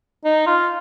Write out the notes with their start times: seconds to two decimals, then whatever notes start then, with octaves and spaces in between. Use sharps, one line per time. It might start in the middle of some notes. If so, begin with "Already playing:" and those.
0.24 D#4
0.47 F4